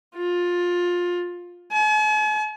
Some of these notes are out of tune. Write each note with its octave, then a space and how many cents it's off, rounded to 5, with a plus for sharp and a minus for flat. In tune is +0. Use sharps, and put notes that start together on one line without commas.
F4 +15
G#5 +45